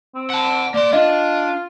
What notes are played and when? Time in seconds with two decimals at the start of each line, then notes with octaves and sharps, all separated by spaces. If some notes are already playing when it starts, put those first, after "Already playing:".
0.15 C4
0.30 F#5 A5
0.74 A#3 D5 C6
0.93 D4 F4 D#5